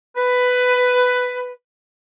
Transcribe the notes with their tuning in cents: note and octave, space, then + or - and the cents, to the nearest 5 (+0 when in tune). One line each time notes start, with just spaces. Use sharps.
B4 +10